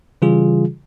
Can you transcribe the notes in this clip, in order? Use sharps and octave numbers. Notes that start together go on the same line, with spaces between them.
C#3 E3 G3 F4 G#4